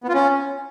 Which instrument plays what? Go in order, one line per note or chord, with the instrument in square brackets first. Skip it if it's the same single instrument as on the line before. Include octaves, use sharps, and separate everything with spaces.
[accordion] B3
F4
C#4